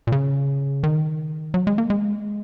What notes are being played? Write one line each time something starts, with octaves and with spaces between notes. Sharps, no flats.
A#2
C#3
D#3
F#3
G#3
A#3
G#3